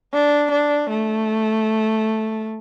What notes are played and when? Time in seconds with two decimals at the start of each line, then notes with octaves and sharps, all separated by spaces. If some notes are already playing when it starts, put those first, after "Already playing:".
0.13 D4
0.51 D4
0.90 A3